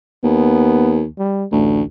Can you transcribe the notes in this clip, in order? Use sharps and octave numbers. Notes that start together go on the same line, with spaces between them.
D#2 B3
G3
A1 D2